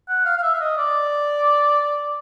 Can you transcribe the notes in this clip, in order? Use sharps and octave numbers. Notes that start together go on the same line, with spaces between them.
F#5
F5
F5
E5
E5
D#5
D5